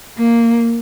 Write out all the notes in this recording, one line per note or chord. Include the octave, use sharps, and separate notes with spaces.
A#3